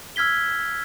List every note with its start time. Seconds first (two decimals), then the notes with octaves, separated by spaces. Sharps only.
0.16 E6 F6 G#6 B6 G7